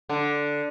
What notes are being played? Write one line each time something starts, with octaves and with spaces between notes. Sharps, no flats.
D3